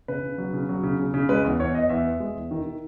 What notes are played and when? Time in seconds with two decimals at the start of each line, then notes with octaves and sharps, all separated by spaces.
0.08 C#3 B4
0.23 C#3
0.38 F#3
0.53 C#3
0.69 F#3
0.83 C#3
0.99 C#3
1.14 C#3
1.29 G#3 B4
1.44 E2
1.60 E2 C#5
1.74 B3 D#5
1.89 E2 E5
2.05 B3
2.20 G#3
2.35 E2
2.51 D#3
2.65 D#3